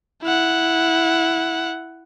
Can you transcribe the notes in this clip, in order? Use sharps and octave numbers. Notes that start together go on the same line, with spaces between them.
E4 F#5